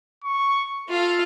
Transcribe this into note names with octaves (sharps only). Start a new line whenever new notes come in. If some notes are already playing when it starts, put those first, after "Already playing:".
C#6
F4 A4 F5